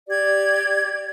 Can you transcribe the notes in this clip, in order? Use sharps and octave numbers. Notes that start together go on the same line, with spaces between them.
G4 D5 G#6